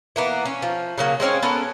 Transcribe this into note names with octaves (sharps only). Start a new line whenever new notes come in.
E3 A#3 B3
C#4
F3
C#3 F#3 A#3
G#3 C4 C#4 C#5
B3 C#4 A4 A#4